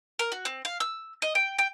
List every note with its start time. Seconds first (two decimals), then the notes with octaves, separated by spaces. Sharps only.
0.19 A#4
0.32 F#4
0.45 C4
0.65 F5
0.80 E6
1.22 D#5
1.35 G5
1.59 G5